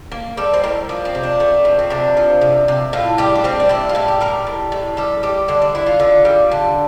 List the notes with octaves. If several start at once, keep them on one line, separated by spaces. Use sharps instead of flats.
A#3
G3 A4
C5
A2 A#4
F3 D4
C4
C3
D4
A3
F3
C4
C3 D4
F3
C3
C3
A2 F4
G3 G4
D4
G3 C4
D4
A2 E4
F4
A2 E4
G4
G3 A#4
A2
A2
G3 A4
G3 G4
D3 D4
D4
D3 E4
F4
D3 F4
G3
D3